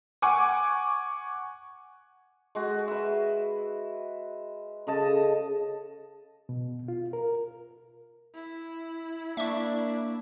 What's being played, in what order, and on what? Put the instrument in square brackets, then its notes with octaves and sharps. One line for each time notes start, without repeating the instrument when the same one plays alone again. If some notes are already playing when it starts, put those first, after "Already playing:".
[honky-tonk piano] F#5 G#5 C#6 D6
[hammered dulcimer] G#3 F#4
B4 E5
C#3 A4 D#5 A5
[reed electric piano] B2
F4
A#4
[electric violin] E4
[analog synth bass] A#3 [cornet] D4 [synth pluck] E5 C#6